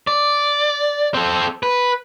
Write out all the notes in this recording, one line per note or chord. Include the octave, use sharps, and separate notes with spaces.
D5
C4 A4
B4